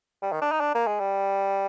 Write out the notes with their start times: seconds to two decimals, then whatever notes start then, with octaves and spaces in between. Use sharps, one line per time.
0.22 G3
0.32 D#3
0.41 D4
0.52 D#4
0.60 D4
0.74 A#3
0.87 G#3
1.00 G3